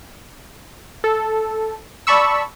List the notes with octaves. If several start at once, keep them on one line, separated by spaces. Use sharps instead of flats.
A4
D5 A5 B5 C#6 E6